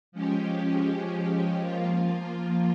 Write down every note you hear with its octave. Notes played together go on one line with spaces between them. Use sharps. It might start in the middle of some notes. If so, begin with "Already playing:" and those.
F3 G#3 C#4 G4
F3 A#3 F4